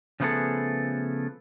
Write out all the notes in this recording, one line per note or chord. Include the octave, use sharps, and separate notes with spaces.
C#3 F3 A3 B3 G#4 A4